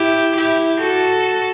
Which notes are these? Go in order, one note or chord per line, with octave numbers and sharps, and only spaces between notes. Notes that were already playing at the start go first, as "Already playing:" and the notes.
Already playing: E4 G4
E4 G4
F#4 A4